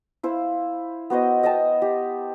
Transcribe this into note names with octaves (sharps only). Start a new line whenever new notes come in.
E4 C5 F5
B3 F#4 C5 D#5
D#5 G5 A5
G4